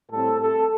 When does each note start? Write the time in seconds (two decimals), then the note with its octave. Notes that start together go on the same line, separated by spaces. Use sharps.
0.11 A2 G3 C4 A4
0.40 A4